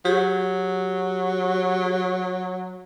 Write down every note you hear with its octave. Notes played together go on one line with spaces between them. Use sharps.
F#3 G4 G#4